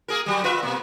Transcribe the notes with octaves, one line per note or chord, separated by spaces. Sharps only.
A#3 G#4 A#4
F#3 G3
F4 B4 E5
B2 A#3